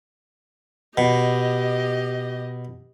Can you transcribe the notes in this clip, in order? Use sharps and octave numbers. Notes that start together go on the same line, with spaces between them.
B2 G4 D#5